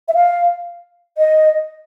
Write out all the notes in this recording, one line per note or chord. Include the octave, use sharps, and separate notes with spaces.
E5
F5
D#5